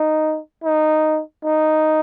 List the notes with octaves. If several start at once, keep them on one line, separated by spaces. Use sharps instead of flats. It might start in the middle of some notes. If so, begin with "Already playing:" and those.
Already playing: D#4
D#4
D#4